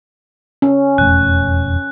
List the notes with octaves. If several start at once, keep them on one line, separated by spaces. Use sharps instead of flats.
C#4
E1 F2 A3 F#6